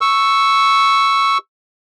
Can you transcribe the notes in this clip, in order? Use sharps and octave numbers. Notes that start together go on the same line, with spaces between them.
C#6 E6